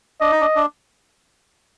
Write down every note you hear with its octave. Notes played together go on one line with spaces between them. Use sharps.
D4 D#5
D#4
D4
D4